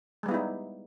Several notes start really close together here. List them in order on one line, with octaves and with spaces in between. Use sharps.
G#3 G3 B3 E4 D#4